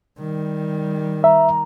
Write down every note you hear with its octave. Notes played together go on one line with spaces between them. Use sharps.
D#3 G3
E5 A#5